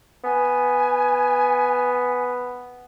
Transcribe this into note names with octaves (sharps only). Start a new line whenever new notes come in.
B3 G#5